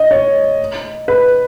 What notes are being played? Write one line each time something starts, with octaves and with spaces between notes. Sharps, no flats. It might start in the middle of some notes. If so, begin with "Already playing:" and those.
Already playing: D#5
C#5
B4